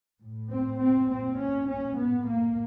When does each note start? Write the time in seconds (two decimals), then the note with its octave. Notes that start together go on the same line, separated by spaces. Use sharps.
0.21 A2
0.50 C4
0.79 C4
1.08 A#2 C4
1.38 C#4
1.67 C#4
1.96 A2 B3
2.26 A#3